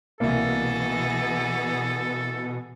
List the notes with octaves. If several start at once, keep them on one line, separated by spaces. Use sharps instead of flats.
C2 B2 E3 A#3 B3 G#4 A4